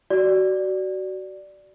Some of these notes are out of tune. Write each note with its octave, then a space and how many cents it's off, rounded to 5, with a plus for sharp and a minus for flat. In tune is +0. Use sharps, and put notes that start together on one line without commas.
F#4 +25 D5 +0